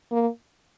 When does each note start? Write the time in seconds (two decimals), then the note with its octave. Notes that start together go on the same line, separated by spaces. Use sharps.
0.12 A#3